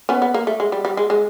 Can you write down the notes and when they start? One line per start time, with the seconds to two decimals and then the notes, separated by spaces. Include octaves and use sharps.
0.09 B3 C#4
0.22 B3
0.34 A#3
0.47 A3
0.60 G#3
0.72 G3
0.85 G3
0.97 G#3
1.10 G#3